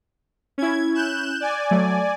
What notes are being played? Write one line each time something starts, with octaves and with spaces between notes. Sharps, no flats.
C#4 E4 G#6
F#6 G6 E7
D5 G#5
F#3 A3